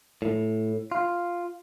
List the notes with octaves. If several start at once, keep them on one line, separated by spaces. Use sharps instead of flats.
A2
F4